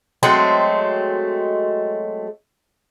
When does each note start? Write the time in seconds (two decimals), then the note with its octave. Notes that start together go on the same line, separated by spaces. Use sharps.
0.23 F#3 G#3 A3 C4